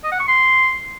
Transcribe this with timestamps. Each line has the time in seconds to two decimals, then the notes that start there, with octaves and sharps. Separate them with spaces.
0.04 D#5
0.12 F#5
0.20 C#6
0.28 C6